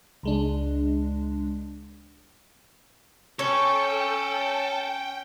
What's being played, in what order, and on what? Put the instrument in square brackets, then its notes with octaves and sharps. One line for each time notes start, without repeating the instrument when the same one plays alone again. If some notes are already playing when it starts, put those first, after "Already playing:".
[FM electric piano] C#2 G#3 D4
[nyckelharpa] C#4 [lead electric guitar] A4 [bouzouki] C#5 [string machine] G5